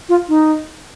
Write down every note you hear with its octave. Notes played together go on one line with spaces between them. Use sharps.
F4
D#4